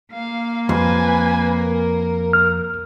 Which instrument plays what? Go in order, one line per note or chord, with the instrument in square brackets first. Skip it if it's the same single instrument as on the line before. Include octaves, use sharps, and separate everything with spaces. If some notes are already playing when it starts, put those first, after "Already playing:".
[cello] A#3 [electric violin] F5
[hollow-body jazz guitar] F2 [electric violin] B4 G#5
[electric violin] A#4
[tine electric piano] F6